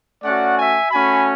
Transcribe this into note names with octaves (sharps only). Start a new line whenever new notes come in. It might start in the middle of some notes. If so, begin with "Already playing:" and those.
A3 C#4 F#4 D5 F#5
E5 G#5
A3 C#4 F#4 G#5 B5